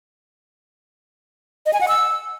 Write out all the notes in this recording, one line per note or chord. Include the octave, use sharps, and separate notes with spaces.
D#5
G#5
F#5
E6